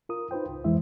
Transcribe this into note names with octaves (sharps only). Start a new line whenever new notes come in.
F4 A#4 D#6
D#4 F4 B4 C5 G5
C#2
F2 E3 G#3 E4 C5 E5